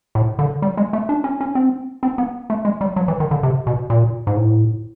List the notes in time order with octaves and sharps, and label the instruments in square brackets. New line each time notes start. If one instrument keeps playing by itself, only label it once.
[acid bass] A2
D3
G3
G#3
A3
D4
C#4
C#4
C4
C4
B3
A3
G#3
G3
F#3
E3
D#3
D3
C3
B2
A#2
G#2
A2